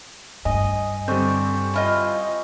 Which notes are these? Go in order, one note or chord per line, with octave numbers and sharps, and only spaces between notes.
G2 D#5 G#5 A#6
D3 G3 C4 C#6 G6
E4 F4 D#5